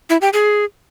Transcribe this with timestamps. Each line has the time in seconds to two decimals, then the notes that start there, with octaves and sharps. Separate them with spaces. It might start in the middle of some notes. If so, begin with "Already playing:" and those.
0.10 E4
0.21 G4
0.33 G#4